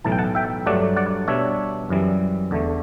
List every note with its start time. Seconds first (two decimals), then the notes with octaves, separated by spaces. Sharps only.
0.04 B1 A2 E3 A5
0.12 G5
0.18 F#5 A5
0.35 E5 G5
0.66 G2 F#3 A3 D4 D5 F#5
0.96 D5 F#5
1.28 B2 G3 D4 C#5 E5
1.89 F#2 E3 G3
2.51 E2 D3 A3